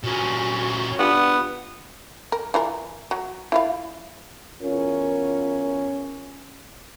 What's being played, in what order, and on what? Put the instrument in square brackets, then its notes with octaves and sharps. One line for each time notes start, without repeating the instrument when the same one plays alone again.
[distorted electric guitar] A#2 C#4 [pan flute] F#4
[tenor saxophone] B3 [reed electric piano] D4 F4 G4
[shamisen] A#4
E3 F4 A#4
F#3
E4 F4 F5
[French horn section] E2 F4 A#4 [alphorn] C#4